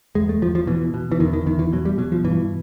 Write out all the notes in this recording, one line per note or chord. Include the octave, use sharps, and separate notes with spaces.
E2 G#3
A3
E2 F3
F3
B2 E3
B2
E3
E2 D#3
D#3
E2 D#3
E3
B2 F#3
G3
B2 F#3
F3
G2 E3